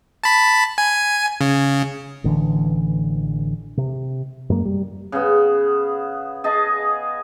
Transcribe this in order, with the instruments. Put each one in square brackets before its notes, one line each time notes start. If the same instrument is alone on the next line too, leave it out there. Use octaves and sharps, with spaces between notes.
[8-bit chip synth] A5 B5
G#5
C#3
[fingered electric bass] A1 D3 E3
C3
F#2 G#3 A#3
G3
[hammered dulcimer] C#3 B3
G#4 D#5 A5